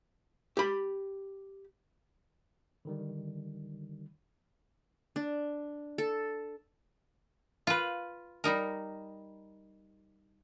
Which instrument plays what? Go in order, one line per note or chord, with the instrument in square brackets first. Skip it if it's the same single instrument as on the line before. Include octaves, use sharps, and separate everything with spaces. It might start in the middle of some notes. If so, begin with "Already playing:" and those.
[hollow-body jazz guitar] G4 B5
[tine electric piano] D3 D#3 G3
[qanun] D4
A4
[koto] F4 B4
G3 D#4 A#4